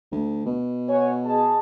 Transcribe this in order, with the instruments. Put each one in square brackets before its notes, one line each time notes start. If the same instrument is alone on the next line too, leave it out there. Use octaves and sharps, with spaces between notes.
[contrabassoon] D2
B2
[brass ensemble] F#4 C#5 G#5
G#4 D#5 A5